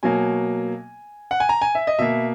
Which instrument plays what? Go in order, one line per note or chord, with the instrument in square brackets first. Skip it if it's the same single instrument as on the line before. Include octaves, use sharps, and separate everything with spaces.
[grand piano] B2 F#3 A#3 G#5
F#5
G#5
A#5
G#5
E5
D#5
B2 A#3 E5